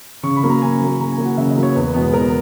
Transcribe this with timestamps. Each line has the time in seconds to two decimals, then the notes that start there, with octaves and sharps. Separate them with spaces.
0.23 C#3 C#6
0.36 B5
0.43 F#3 A#3
0.49 A#5
0.62 C#3 G#5
0.80 F#3 A#3
0.99 C#3 A#5
1.12 G#5
1.18 F#3 A#3
1.25 F#5
1.37 C#3 E5
1.50 D#5
1.56 F#3 A#3
1.63 C#5
1.75 E2 B4
1.94 B2 G#3 B3
2.13 E2 A#4